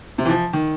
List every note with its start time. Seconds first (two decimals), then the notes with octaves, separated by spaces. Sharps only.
0.18 C3
0.25 E3
0.29 F3
0.53 D#3